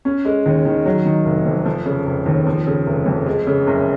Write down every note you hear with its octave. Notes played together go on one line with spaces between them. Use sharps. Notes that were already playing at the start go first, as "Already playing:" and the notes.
C#4
G#3
D#2
D#3
F#3
D#3
F1
F2
F3
C#3
F1
D#2
F3
C#3
F1
F2
G#3
C#3
F#1